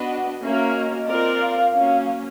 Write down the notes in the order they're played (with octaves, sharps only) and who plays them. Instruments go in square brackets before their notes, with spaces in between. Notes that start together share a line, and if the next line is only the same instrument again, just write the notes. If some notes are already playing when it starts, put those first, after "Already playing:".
Already playing: [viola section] B3 D4 F#4 B4 D#5 [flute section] F#5
[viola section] A#3 C#4 F#4 A#4 [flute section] E5
[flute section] D#5
[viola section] C4 F4 A#4 D5
[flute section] F5
[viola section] F#3 A#3 C#4